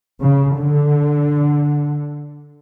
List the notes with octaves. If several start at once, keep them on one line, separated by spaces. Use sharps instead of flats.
C#3
D3